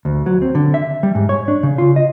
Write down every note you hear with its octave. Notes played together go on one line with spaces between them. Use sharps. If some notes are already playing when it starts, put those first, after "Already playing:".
D2
F#3
C4
D3
E5
G3
G#2
C#5
D4
C#3
F4
D#5